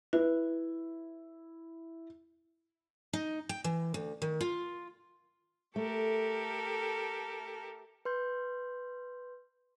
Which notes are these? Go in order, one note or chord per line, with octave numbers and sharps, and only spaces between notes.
E4 B4
D#4
G5
E3
D2
D#3
F4
A3 G4 A4 A#4
B4 C6 G6